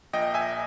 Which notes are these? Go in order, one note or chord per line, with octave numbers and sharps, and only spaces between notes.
A#1 A#2 D#5 G5
E5 G#5